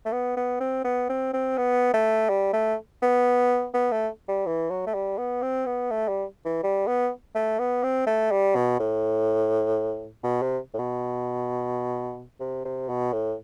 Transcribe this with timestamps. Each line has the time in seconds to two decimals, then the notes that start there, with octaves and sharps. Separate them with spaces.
0.05 A3
0.12 B3
0.37 B3
0.60 C4
0.84 B3
1.09 C4
1.33 C4
1.57 B3
1.94 A3
2.29 G3
2.53 A3
3.02 B3
3.74 B3
3.92 A3
4.28 G3
4.46 E3
4.70 F#3
4.87 A3
4.94 G3
5.18 B3
5.42 C4
5.66 B3
5.91 A3
6.08 G3
6.45 E3
6.63 G3
6.87 B3
7.35 A3
7.59 B3
7.83 C4
8.07 A3
8.31 G3
8.55 B2
8.80 A2
10.24 B2
10.42 C3
10.74 A2
10.79 B2
12.40 C3
12.65 C3
12.89 B2
13.13 A2